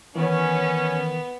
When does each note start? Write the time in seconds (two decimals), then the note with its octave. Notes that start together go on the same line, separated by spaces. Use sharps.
0.16 D#3 E3 B3 C#4